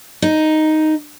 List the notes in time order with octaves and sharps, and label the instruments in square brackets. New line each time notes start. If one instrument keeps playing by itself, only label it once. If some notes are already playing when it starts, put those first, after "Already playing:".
[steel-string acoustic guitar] D#4